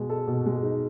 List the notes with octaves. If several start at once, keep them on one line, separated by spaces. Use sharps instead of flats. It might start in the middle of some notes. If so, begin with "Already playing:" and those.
Already playing: B2 G#3
A4
B2
G#3
D#4